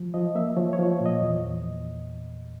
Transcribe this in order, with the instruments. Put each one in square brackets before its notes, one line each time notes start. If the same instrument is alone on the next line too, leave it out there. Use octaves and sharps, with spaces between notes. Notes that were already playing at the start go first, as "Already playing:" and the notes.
Already playing: [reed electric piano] F3
F3 D#5
A#3 E5
F3 C#5
C#5
F3
A#2
D#5
E2